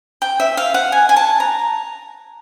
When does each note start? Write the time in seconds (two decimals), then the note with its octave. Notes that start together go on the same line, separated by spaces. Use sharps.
0.22 G5
0.40 E5
0.57 F5
0.74 F#5
0.92 G#5
1.09 G#5
1.17 A5
1.40 A#5